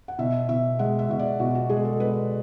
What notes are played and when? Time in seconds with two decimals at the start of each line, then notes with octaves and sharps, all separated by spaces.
0.08 F#5
0.19 B2 E5
0.49 B2 E5
0.79 G#3 F#5
0.99 E5
1.09 B2 E5
1.19 D5
1.40 B2 F#4
1.55 F#4
1.69 G#3 G#4
1.85 A4
2.00 G#3 B4